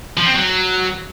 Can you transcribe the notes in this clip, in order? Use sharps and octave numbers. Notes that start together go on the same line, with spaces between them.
F3
C4
F#3